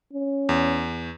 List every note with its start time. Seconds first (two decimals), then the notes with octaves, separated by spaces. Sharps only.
0.13 C#4
0.49 E2